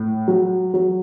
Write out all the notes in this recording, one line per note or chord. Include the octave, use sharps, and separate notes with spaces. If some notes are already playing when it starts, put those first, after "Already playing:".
Already playing: A2
F#3
F#3